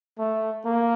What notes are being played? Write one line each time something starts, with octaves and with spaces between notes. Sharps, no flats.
A3
A#3